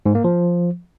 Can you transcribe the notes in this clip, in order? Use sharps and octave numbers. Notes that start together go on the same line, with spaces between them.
G#2
A#3
F3